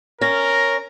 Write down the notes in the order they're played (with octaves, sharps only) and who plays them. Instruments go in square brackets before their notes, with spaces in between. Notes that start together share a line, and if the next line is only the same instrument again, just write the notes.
[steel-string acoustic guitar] C#4 [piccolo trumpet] A#4 [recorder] A#6